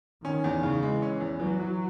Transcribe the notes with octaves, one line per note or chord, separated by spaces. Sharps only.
D#3 C#4
E2
D#3
C#3
E3 G#3
C#4
E2
E3 F#3
E3